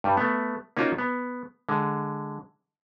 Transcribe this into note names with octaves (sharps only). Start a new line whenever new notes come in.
G2 G3
A3 B3
A#3 C#4 D#4 F4 F#4 A#4
B3
D3 G#3